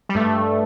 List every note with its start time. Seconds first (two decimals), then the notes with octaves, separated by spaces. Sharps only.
0.09 G3
0.15 G2 A3